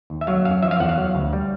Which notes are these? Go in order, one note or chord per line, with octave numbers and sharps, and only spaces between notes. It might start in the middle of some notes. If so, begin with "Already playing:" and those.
D#2
E5
F#3 F5
F#2 F5
F3 E5
F5
E2 F#5
F5
F#3
D2
G3